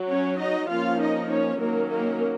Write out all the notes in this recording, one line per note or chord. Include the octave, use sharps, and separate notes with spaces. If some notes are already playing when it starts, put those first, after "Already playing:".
Already playing: F#3
C#4 C#5
D#4 D#5
F3 A#3 C#4 F4 F5
D#4 D#5
C#4 C#5
D#3 F#3 A#3 C#4 A#4
A#3 A#4